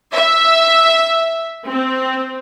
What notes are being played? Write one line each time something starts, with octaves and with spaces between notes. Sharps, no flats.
E5
C4